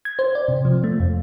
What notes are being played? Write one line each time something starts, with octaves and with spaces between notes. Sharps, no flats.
G#6
C5
D5
C3
F3
A3
F2